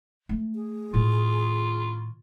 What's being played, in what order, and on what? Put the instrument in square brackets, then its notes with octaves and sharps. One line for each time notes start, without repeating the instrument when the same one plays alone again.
[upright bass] A3
[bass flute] G#4
[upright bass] A2 D#3 [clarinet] F4